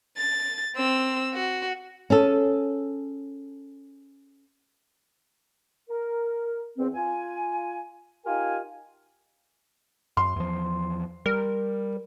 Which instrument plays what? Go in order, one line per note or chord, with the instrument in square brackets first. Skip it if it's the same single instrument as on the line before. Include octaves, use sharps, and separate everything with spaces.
[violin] A6
C4 E6
F#4
[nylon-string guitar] C#4 G#4 A4
[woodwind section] A#4
E2 C4
F4 G#5
D#4 F4 G4 A#4 G#5
[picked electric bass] F#2 [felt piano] C6
[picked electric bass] E2 F3
[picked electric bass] G3 [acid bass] A#4